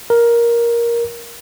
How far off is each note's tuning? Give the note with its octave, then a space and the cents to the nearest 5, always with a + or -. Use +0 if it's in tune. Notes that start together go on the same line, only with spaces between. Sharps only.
A#4 +10